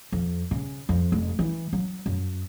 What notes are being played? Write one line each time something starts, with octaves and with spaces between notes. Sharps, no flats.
F2
C#3
F2
F1
E3
F#3
F#2